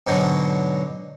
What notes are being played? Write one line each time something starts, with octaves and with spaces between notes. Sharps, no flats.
G#2 B2 D3 F#3